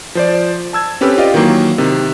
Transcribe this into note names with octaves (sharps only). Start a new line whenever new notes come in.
F3 C5 D5
A5 E6 G#6
C4 C#4 G4 A4 B4
F4 G4 D5 D#5 F5
D#3 E3 F#3 A#3
C3 D#3